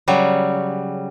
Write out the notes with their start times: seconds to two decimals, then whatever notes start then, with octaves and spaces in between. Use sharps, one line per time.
0.08 C#3 F#3 G3